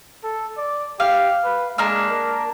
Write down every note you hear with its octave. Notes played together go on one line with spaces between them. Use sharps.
A4
D5
G4 F5
B4
G#3 A#3 D4 F6
A#4